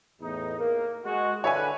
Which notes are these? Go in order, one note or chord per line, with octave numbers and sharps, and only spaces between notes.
E2 A2 D#4
A#3
G#3 F#4
D3 B4 C#5 E5 G#5